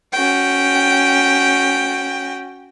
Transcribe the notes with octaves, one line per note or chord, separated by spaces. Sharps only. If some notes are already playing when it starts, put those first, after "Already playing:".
C#4 F#4 G5